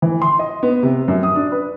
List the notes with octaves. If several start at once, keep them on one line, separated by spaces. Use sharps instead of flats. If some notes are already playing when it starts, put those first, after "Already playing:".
E3
C6
D#5
B3
C3
F#2
D#6
D4
B4